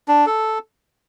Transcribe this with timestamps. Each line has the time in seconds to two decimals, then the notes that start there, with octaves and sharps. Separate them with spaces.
0.08 D4
0.26 A4